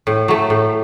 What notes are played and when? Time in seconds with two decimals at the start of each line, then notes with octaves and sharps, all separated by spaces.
0.07 A2
0.28 F#3 A3
0.50 A2